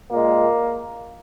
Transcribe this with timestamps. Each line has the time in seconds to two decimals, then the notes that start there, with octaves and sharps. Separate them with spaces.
0.12 A#2 G#3 A#3